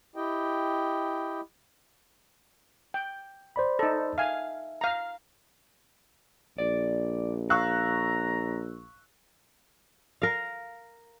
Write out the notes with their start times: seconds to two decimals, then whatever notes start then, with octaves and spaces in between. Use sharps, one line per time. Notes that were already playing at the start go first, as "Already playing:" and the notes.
0.16 E4 G4 D#5 G5
2.94 G5
3.56 C5 D5 B5
3.79 D#4 A4
4.18 E5 F5 G#5
4.81 F5 A#5
6.58 A#1 D5
7.50 F5 A#5 C#6 E6 F#6
10.22 A#4 F5